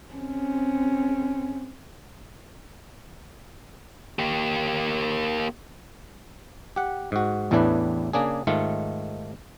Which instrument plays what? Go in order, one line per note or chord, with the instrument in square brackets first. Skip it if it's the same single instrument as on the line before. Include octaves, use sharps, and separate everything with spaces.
[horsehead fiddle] C4 C#4
[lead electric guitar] A#3 G4
[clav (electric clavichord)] G4 F#5
G#2 F#4
A1 E2 A2 E3 D4 B4
C#3 A#3 D4 G#4
G#2 D#3 A3 F4